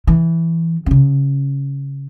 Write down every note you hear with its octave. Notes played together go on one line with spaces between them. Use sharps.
E3
C#3 C#4